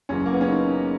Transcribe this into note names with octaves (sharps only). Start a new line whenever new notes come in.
F#1 F#2 C#3 E3 C#4
A#3
B3
C#4
D#4